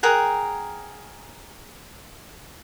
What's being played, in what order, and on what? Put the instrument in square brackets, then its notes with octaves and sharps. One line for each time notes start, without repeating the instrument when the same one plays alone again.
[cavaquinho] G#4 A#4 F#5 G5